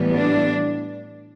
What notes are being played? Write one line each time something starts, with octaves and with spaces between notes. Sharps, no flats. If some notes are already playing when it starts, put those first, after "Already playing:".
Already playing: A2 E3 G3 B3
D4